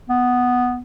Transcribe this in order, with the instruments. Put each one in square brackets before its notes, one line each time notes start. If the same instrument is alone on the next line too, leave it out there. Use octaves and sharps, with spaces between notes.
[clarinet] B3